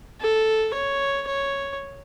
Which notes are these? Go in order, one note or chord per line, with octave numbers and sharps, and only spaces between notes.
A4
C#5
C#5